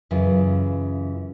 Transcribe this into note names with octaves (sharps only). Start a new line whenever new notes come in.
F#2 C#3 E3 F4